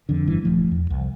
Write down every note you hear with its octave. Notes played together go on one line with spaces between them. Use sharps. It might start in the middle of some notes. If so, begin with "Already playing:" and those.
F2 D3
F1 G2 E3
D#1 F3 A3
E2
C2